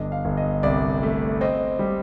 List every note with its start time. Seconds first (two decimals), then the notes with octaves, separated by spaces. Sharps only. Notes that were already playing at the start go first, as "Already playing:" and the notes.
Already playing: G1 D4 D#5
0.12 F5
0.25 G1
0.37 D#5
0.63 C2 D5
1.03 A3
1.41 C4 D#5
1.79 G3